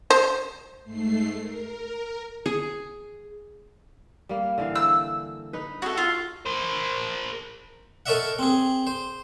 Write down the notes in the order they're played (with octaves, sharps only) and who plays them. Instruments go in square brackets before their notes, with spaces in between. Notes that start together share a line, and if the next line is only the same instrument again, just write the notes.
[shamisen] C5
[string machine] G#2 A3 C7
A#4
[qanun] G#4
[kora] G3 A#3
D3 E3 F5
[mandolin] E6
[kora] D#4 B4
[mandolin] F#4 A4
F4
[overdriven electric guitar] A#4 C5
[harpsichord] A4 A#4 C#5 D#5 E5 F#5
C4 G#4
C5